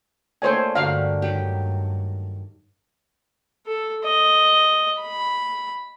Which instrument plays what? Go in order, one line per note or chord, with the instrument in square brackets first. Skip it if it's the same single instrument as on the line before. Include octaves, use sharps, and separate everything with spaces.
[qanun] A3 A#3 D4 [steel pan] C5 C#5 G#5
[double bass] G2 [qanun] D3 F#4 G4 [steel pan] F5
[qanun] D#3 F#3 G4
[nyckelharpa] A4
D#5
B5